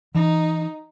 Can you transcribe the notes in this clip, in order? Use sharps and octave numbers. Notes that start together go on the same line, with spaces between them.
E3 D#4